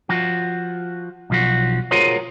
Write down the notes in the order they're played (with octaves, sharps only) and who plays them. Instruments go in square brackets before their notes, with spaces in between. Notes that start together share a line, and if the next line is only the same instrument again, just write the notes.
[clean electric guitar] F3 F#4
B1 F3 F#4
F4 F#4 G#4 A#4 C5 C#5